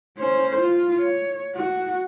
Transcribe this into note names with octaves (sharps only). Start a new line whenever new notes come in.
C#4 C5
F4
C#5
F#4